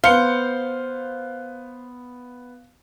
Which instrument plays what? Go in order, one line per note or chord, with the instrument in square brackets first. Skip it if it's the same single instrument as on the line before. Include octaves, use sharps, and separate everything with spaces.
[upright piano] B3 C#7 G7 [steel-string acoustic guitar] C5 [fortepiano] F5